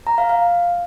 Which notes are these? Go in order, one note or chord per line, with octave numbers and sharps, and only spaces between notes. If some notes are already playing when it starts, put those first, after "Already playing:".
A#5
F5
F5